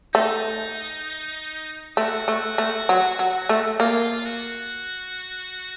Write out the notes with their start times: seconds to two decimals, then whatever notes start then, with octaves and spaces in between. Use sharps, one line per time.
0.14 A3 D#4
1.97 A3 F#4
2.28 A3
2.58 A3
2.89 F#3
3.19 F#3
3.49 A3
3.80 A#3 F4
4.26 F#4